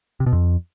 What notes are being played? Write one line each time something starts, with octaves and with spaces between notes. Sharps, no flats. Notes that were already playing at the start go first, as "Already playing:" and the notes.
C3
B2
F2